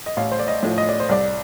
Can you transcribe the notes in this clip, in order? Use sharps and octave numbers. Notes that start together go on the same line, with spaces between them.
D#5
A1 F5
C5
D5
D#5
A2 F3
D#5
D5
C5
C2 D5